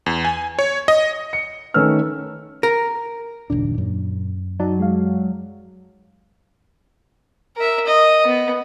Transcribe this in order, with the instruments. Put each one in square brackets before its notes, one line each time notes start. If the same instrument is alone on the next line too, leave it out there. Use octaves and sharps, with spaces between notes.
[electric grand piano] E2
G#5
C#5
D#5
[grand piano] C#7
D#3 A3 C#4 B4 E6 F6
[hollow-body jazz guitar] A#4
[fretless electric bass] F#1 D#2 D4 [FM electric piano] A#2
[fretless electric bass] F#2
[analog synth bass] F#3 [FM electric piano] D#4 D5 A5
[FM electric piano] G#3 F5
[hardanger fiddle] A#4 E5
D#5
B3